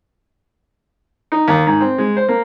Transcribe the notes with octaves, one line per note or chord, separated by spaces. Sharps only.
D#4
D#2
G#2
C4
G#3
C5
A#3